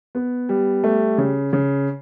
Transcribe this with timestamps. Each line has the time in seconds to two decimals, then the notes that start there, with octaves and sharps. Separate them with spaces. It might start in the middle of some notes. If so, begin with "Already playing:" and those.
0.15 B3
0.49 G3
0.84 A3
1.18 C#3
1.53 C#3